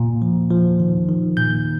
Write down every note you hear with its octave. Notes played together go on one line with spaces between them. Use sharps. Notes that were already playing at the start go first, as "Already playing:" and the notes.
Already playing: A#2
F3
F3
D#3
D#3
A#2 G6